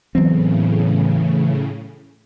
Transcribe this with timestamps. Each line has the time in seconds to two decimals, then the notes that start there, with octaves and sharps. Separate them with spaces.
0.15 A2 C#3 E3 F#3 B3 C4